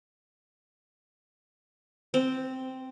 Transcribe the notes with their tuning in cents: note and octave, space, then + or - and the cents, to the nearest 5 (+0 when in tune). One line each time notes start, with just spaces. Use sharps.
C4 -5